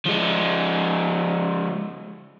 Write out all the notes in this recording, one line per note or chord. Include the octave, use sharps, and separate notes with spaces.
F3 G#3